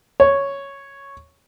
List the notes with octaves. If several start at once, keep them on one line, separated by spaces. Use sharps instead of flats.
C#5